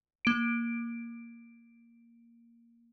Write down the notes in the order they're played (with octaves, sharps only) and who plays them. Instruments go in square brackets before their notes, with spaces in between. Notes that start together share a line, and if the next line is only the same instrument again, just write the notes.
[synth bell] A#3 D7